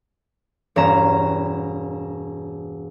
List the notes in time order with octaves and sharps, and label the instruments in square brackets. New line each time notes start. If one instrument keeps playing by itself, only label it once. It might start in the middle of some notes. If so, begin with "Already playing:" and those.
[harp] E1 G2 C#4 A#5 E7